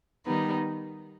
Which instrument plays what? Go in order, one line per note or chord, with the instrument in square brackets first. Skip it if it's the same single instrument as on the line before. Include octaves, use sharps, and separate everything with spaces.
[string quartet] D#3 G3 B3 D#4